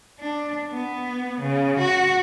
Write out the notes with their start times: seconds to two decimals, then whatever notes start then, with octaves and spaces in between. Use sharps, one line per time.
0.19 D4
0.71 B3
1.40 C#3
1.78 F#4